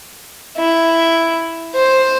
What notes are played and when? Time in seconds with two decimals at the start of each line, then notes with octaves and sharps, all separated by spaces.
0.57 E4
1.75 C5